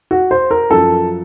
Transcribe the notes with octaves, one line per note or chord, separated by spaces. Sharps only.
F#4
C5
A#4
F#2 F3 A4